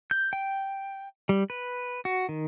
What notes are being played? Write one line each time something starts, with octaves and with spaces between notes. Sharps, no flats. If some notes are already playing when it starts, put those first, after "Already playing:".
G6
G5
G3
B4
F#4
D#3